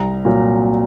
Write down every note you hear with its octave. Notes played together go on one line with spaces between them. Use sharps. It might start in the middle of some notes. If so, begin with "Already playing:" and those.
Already playing: C2 A#5
A#2 F#3